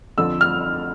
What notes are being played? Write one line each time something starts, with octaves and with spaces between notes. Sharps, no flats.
F2 D3 F3 E6
F6